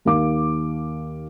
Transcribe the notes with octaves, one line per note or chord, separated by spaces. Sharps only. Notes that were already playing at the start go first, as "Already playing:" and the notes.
D#2 F5 D6